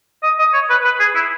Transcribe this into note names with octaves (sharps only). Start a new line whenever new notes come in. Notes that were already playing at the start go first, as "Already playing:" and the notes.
D#5
D#5
C#5
B4
B4
G#4
E4